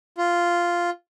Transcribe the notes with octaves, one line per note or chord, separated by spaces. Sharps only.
F4